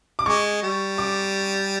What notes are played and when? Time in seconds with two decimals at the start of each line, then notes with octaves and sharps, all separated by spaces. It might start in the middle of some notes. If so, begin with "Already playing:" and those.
0.19 D6
0.26 G#3 C#6
0.63 G3
0.98 D6